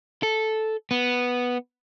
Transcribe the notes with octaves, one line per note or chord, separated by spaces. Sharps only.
A4
B3